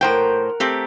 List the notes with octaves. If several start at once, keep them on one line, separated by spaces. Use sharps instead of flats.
A2 A#4 C5 F#5 G5
A3 C4 G4